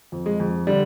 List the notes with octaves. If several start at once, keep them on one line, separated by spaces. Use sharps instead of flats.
F2
G#3
F2
D3 G3